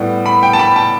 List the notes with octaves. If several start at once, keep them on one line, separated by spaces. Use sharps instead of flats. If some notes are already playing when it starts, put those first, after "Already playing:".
Already playing: A2 G3 B3
B5
G5
A5
B5
A5